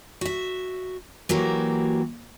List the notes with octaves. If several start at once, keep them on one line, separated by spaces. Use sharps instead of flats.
F#4 E5
E3 F#3 A#3 F#4 G4